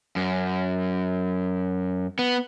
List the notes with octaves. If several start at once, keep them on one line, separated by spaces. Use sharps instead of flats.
F#2
B3